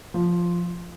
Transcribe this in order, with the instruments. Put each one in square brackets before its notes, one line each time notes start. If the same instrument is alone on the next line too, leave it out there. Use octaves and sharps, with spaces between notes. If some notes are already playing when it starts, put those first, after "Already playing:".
[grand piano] F3